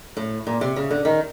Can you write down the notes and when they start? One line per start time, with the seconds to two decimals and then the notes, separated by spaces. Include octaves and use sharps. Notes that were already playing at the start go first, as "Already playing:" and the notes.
0.17 A2
0.47 A#2
0.61 C3
0.76 C#3
0.90 D3
1.05 D#3